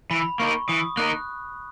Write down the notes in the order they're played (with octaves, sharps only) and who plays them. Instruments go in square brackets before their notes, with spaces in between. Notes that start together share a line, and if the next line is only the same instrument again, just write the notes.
[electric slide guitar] E3 [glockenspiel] B5
[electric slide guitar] A#3 D#4 A#4 [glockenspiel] C#6
[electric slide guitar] E3 [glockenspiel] D#6
[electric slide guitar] A#3 D#4 A#4 [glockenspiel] F#6